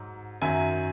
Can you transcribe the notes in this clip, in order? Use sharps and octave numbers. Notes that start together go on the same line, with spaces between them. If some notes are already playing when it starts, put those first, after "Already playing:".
Already playing: G#2 F#3
F#2 D#3 F#3 E5 G#5